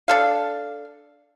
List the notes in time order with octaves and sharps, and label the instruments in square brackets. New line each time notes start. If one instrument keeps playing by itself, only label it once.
[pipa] D4 A4 F5